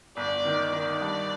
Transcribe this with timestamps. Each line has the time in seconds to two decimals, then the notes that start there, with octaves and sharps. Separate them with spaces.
0.17 G1 D5
0.45 D#3
0.72 D#3 D5
1.01 G2